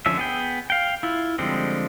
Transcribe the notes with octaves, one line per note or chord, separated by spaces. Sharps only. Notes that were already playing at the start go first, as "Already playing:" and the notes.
D3 F3 C#4 E5
B3 G#4 G5
F5 G5
E4 F4
D3 F3 G3 G#3 C4